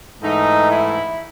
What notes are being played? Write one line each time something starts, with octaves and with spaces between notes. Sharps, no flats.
G#2 E3 A3 D#4
E4